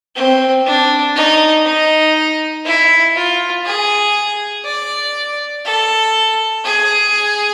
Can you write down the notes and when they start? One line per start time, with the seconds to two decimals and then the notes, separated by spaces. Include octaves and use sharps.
0.15 C4
0.65 D4
1.15 D#4
1.65 D#4
2.65 E4
3.15 F4
3.65 G#4
4.65 D5
5.64 A4
6.64 G#4